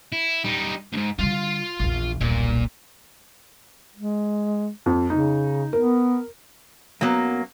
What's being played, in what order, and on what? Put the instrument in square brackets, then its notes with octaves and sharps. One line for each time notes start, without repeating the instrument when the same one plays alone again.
[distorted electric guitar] E4
G3 D#4
D2 G#2
[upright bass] D3 G3 [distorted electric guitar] F4 F5
[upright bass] A#1 E2
[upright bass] D#1 B1 [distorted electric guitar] A#2
[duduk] G#3
[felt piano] F2
[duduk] C#3 [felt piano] D#4
[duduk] B3 [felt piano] A#4
[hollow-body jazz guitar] F#2 B3 [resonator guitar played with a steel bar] F#3 A#3